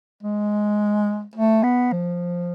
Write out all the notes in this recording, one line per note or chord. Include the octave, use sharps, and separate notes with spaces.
G#3
A3
B3
F3